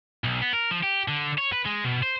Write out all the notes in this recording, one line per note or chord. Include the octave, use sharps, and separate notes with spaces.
B1
B3
A#4
F3
G4
D3
C#5
B4
G#3
B2
C5